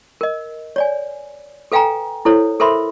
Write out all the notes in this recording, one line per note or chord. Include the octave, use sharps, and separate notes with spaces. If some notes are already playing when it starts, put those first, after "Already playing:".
A#4 D#5
C#5 D5 G#5
A4 B4 F5 G5 G#5 A#5
E4 A4 C5 C#5
A4 A#4 C5 E5 B5 C6